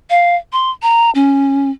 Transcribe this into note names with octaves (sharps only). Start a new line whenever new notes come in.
F5
C6
A#5
C#4